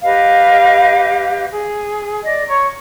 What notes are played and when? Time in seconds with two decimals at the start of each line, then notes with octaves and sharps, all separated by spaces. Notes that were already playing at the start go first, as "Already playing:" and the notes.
0.02 G4 B4 D#5 F5
1.51 G#4
2.23 D5 D#5
2.47 C#5 A#5 C#6